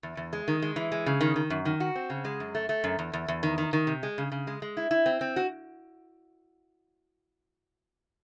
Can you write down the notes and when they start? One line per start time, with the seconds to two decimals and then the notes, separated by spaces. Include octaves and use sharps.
0.03 E2
0.17 E2
0.33 G#3
0.48 D#3
0.62 G#3
0.76 E3
0.92 G#3
1.06 C#3
1.21 D#3
1.36 D#3
1.50 F#2
1.65 D#3
1.80 F#4
1.95 C4
2.10 C#3
2.25 G#3
2.40 F#2
2.55 A3
2.69 A3
2.84 F#2
2.99 E2
3.13 E2
3.28 E2
3.43 D#3
3.58 D#3
3.73 D#3
3.87 C3
4.03 G#3
4.18 C#3
4.32 C#3
4.47 G#3
4.62 G#3
4.77 E4
4.91 E4
5.06 C4
5.21 C4
5.36 F#4